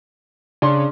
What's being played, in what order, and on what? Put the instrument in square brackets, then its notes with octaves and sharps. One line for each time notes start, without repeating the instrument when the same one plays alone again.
[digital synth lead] C#3 [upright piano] D4 C6